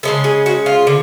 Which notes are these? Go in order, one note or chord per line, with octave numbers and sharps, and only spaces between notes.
C#3 G#3 C#4 A4
G#4
F#4
F4
D3